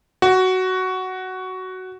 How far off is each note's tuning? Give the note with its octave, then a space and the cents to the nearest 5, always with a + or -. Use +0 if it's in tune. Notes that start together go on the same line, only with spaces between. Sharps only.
F#4 +10